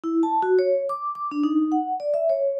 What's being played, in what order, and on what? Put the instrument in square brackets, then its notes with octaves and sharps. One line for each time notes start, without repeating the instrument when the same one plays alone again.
[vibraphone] E4
A5
F#4
C#5
D6
D6
D4
D#4
F#5
D5
E5
C#5